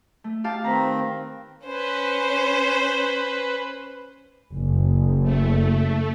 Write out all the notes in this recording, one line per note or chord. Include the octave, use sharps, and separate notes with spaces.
A3
G4 F5 A5
D#3 C4 B4 A#5
C#4 B4 C5
F#1
A3